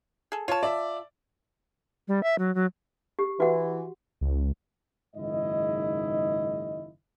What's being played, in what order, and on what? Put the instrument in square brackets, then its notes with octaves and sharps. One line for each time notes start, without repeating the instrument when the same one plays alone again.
[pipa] G#4 A4
[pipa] F4 A5 [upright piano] C#5
[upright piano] D5 E5
[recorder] G3
E5
F#3
F#3
[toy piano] G4
[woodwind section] E3 [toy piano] F#4 F#5
[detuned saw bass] C#2
[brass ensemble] F#1 G#2 D#3 E4 D#5